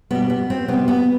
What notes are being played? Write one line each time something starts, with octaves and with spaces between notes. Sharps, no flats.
B2 G3 B3
B3
C4
C3 G3 B3
B3